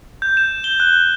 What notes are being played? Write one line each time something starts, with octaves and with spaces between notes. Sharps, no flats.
G6
E7
G7
F#6